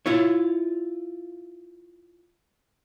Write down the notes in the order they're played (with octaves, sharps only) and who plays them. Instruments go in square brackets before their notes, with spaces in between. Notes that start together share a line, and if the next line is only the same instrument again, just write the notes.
[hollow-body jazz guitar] E4 F4 C#5